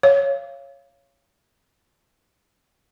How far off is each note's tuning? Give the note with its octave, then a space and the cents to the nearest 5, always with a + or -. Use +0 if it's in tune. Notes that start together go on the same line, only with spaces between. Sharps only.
C#5 +0 F5 -25